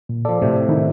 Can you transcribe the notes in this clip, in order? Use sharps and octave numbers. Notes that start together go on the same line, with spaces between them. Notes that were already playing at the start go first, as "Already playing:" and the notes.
A#2
F3 A4 D5
A2 C3
D#3 D#4 E4